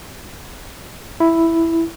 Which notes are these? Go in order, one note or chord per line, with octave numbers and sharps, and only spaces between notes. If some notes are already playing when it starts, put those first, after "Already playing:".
E4